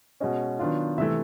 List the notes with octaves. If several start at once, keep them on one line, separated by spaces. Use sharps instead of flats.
B2 G#3 C#4 D#5
D#3 F#3 B3 D4 F4
C3 E3 A3 E5